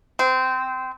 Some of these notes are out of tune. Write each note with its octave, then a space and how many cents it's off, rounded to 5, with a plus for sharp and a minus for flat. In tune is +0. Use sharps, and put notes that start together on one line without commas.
C4 -20